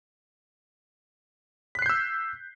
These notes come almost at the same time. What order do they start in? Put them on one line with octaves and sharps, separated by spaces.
B6 F#6 C7 G6 E6